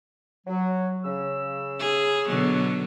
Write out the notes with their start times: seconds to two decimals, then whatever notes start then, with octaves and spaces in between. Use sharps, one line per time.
0.47 F#3
1.05 C#3 E6
1.79 G#4
2.28 B2 D3 F#3